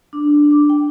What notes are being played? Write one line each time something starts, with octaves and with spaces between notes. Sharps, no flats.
D4
D6
G5